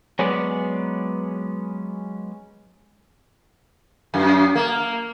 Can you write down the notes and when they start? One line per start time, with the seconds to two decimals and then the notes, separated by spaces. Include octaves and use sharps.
0.19 F#3 G#3 B3 C#4 B4 D5
4.14 F#2
4.55 A#3